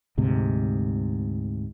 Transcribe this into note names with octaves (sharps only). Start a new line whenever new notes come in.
D2 G#2 C3